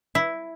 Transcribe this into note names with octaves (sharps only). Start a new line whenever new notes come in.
E4